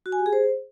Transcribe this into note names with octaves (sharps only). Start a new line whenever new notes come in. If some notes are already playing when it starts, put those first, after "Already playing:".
F#4
G#5
G4
G#4
C5